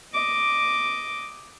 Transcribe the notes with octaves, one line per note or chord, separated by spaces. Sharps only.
D#5 D6